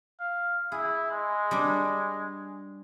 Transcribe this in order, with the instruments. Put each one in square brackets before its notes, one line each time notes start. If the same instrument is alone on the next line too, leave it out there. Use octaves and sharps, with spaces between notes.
[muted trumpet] F5
[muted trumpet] E4 [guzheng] G#4
[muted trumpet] G#3
[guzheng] G3 D4